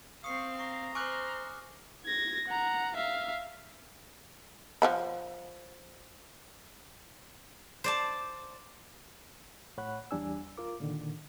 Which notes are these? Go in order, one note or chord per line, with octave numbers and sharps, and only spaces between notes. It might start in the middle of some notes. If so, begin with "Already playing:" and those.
C4 F5 C#6 D#6 C7
A#5 C#6
C5 G#5 C#6 D6 F6 F#6
G#6 A#6
F#5 A#5
E5 F5
F3 F#5 B5
C5 D5 A5
A2 C#5 F#5 B5 F#6
E2 G3 D4 G#5 E6
F4 A#4 D6
A#2 D3 D#3